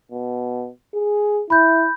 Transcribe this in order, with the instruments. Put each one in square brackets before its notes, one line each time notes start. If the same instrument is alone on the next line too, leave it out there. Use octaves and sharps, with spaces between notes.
[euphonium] B2
G#4
[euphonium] E4 [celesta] B5 G6